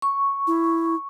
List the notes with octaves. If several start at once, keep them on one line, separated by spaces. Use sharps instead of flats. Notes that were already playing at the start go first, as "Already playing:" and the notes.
C#6
E4